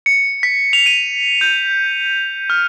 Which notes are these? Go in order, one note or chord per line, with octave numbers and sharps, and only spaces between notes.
C#7
B6
F7
D#7
G6
F6